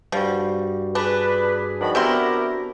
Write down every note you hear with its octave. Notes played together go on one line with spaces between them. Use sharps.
G2 F3 G3 F#4
D4 G#4 B4
D#3 F3 D4 F#4 B5
C3 E3 B3 E4 G4 A#4 C6